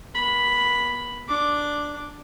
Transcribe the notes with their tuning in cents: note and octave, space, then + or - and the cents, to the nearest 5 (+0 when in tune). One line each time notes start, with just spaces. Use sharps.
B3 -45 B5 +0
D4 +0 D6 +0